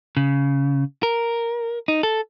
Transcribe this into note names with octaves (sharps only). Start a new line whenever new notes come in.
C#3
A#4
D#4
A4